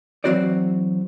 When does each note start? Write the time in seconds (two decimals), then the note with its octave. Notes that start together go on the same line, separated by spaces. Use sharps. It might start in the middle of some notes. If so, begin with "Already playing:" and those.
0.24 E3 F#3 C4 F#4 C5 D5